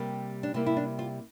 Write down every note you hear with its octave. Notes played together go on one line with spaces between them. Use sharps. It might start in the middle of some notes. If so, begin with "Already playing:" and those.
Already playing: C3 G3 A#3
D4
C3 G3 A#3 E4
E4
D4
F4